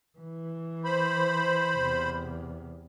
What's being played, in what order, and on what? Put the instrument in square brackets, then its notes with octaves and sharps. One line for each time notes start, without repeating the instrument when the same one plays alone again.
[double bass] E3
[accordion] C5 B5
[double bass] E2 C3